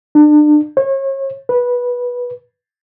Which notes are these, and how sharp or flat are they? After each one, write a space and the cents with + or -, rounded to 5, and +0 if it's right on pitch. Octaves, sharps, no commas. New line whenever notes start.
D4 +35
C#5 -35
B4 -15